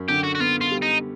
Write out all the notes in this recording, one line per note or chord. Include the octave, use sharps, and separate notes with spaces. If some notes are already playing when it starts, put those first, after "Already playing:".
Already playing: F#2
D3 G4
F#4
F#4
B3 F4
F4
G3
D#4